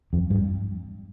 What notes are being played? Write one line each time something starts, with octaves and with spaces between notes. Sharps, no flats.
F2
G2